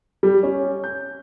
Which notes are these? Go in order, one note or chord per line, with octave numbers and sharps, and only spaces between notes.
G3
C#4
G6